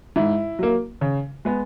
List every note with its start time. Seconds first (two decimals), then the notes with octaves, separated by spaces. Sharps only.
0.16 G#2 E4
0.59 F#3 A#3
1.01 C#3
1.45 G#3 B3